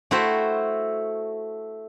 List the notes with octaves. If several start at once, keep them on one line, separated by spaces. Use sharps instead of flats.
A3 E4 F#4 C5 G5